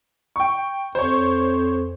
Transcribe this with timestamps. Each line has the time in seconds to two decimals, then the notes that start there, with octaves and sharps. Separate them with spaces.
0.36 G5 C#6
0.95 F2 C5 C#5